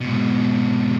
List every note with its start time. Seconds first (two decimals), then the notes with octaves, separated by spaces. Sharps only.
0.01 G#2 B2